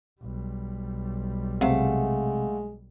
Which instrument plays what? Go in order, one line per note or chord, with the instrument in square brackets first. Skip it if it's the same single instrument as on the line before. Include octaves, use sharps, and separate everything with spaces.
[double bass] B1 G3
[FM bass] C3 [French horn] G#3 [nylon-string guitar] A3 F5 F#5